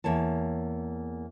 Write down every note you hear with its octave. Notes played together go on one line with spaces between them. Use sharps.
E2 A#3 C#5 A5